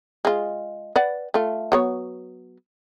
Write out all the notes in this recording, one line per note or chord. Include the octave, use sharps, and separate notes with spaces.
G#3 F4
B4 D5 F#5
A3 F4
F#3 B3 C#5